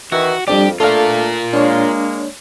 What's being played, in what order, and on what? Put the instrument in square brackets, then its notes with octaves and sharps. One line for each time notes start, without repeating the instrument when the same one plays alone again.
[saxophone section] D#3 E3 [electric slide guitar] F#4
[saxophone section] F2 [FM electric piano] G3 D4 D5 [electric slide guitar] G4
[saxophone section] A3 D4 [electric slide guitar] F4 A#4 [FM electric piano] A4 F5
[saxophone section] G#3 A#3 [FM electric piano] D4 C#5